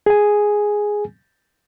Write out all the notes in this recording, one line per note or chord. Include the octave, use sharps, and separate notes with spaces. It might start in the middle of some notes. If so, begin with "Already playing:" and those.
G#4 G#5